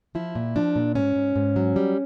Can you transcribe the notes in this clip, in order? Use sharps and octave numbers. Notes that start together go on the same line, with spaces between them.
F3 E4
A#2
F3 D4
A#2
G#2 C#4
G#2
G#2
F#3
G3